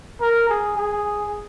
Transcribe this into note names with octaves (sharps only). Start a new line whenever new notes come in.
A#4
G#4
G#4